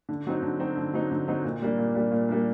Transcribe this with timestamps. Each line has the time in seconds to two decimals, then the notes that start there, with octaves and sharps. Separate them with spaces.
0.09 D3
0.27 F#3 C4 D#4
0.43 D3
0.59 F#3 C4 D#4
0.77 D3
0.93 F#3 C4 D#4
1.11 D3
1.28 F#3 C4 D#4
1.44 A#2
1.62 G3 A#3 D4
1.78 A#2
1.95 G3 A#3 D4
2.12 A#2
2.29 G3 A#3 D4